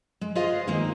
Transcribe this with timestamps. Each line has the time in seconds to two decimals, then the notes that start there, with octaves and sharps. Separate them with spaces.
0.21 G#3
0.35 F4 G#4 B4 C5 D#5 F5
0.67 D#3 G#3 A#3 C4 D#4